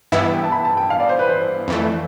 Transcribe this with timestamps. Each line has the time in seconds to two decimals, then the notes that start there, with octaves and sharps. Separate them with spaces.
0.12 G2 E3 B3 E4 E5
0.23 E5
0.32 G5
0.44 A5
0.52 B5
0.65 A5
0.77 G5
0.90 F5
1.00 D5
1.09 C5
1.19 B4
1.29 C5
1.68 F2 E3 A3